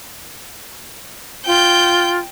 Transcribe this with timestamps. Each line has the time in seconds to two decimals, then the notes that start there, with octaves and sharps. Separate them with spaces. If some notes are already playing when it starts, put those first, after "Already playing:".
1.46 F4 G5 G6